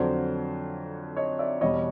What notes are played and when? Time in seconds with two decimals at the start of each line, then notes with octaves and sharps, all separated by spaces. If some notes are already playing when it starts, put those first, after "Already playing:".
Already playing: F2 D3 F#3 C5 D5
1.16 C#5 D#5
1.39 D5 E5
1.61 E2 B2 G3 C#5 D#5